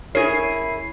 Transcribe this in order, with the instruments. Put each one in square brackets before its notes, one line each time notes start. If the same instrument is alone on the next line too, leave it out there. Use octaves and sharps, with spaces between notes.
[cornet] E4 [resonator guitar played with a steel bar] G#4 A#4 [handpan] C#5 [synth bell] C7